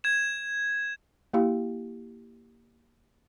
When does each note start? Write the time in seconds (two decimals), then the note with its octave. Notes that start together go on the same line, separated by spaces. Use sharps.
0.04 G#6 E7
1.34 A#3 E4 G4 F5